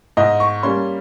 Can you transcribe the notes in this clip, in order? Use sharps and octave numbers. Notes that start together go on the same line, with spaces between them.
G#2 D#5
C#6
G3 A#3 C#4 C6